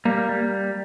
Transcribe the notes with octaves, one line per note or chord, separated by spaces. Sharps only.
G3 A#3
G3